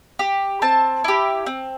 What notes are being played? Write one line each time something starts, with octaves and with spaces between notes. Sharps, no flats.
G4
C4 A5
E4 G4
C4